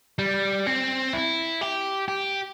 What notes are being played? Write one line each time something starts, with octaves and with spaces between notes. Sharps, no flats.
G3
C4
E4
G4
G4